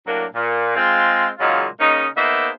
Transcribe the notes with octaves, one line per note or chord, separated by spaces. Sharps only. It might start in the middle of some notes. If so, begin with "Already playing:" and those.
A2 F#3 A#3 D4
A#2
G#3 C4 F4
A#2 C#3 F#3 G#3 D#4 F4
C#3 A#3 C#4 D#4
A#3 B3 D#4 G#4 C5 E5